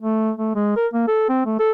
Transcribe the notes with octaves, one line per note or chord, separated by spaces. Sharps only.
A3
A3
G#3
A#4
A#3
A4
C4
A3
A4